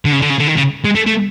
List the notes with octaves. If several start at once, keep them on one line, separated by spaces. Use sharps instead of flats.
D3
C#3
D3
C#3
D3
D#3
C#3
G#3
A3
A3